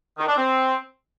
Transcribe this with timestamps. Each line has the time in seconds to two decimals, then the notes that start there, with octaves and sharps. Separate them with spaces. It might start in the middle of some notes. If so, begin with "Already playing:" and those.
0.18 D#3
0.27 D4
0.37 C4